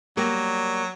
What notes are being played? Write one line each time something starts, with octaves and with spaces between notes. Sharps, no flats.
F#3 G3 A#3 A#4